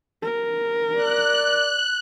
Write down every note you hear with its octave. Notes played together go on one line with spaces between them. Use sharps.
A#4
D5 F#6